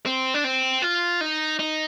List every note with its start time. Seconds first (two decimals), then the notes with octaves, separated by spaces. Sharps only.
0.06 C4
0.34 D4
0.44 C4
0.82 F4
1.21 D#4
1.59 D#4